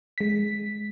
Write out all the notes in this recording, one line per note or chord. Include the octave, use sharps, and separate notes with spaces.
G#3 B6